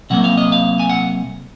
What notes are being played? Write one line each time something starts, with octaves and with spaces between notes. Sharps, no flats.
C3 F#3 A#3 F#5
F5
D#5
F5
G#5
F#5